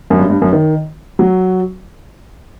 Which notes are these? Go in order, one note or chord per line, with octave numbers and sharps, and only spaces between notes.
F#2
G2
G2
F#2
D#3
F#3